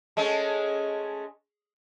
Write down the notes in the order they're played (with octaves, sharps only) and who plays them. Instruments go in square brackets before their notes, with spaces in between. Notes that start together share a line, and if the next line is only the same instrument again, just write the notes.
[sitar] G#3 A3 C#4